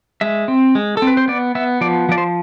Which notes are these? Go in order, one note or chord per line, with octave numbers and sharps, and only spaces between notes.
G#3 E5
C4
G#3
A4
C4
B4
C5
B3 D5
B3 E5
F3 D5
F3 D5
C5